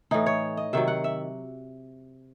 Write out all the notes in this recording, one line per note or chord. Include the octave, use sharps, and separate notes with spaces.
A2 E3 D#4
C#5
D#5
C3 D#3 F#3 E5
F#5
E5